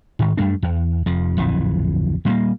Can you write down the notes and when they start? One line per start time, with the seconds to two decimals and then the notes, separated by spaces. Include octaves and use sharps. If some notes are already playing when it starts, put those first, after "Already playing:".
0.19 G#2 D#3
0.37 F#2 G3 A3 D4
0.62 E2
1.06 F1 F2 F3
1.37 D1 A#1 F2 E3
2.25 A#2 G3 A3 A#3